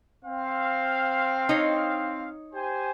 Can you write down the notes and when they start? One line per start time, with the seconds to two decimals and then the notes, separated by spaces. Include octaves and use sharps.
0.24 C4 F5
1.49 D#4 C#5
2.53 G4 C5 G#5